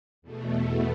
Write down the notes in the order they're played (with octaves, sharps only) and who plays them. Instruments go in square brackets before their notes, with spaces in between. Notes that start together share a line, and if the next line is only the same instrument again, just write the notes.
[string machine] E2 B2 A3